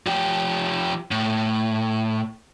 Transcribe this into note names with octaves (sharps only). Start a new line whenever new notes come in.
F3 G4
A2